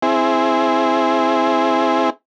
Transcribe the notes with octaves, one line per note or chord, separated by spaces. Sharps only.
C4 E4 G#4